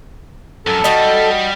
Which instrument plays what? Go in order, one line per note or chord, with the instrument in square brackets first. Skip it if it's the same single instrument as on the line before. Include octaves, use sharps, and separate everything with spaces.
[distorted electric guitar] F#2 [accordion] A4
[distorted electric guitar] G3 [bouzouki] D#4 F#4 D#5